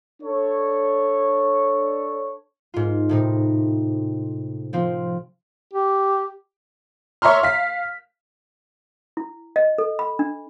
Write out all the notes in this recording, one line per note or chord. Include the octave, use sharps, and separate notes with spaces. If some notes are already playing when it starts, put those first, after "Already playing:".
D4 A4 C#5
G#2 F4
A2 C3 D#4
F3 C4 F4
G4
C#5 E5 A#5 C6 F6
F5 B6
E4
D#5
A4
B5
D4